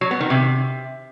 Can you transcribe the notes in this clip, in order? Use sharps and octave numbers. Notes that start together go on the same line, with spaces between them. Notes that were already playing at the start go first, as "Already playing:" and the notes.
F#3
B3
D#3
C3